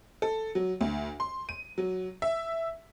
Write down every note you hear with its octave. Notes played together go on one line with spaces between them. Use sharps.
A4
F#3
D2
C6
D#7
F#3
E5